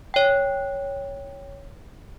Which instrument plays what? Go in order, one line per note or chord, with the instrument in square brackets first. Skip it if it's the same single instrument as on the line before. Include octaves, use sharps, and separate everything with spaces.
[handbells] C#5 G5